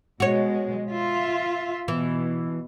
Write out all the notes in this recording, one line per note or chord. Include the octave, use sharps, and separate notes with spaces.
B2 G#3 F#4 C#5
F4 E5
B2 E3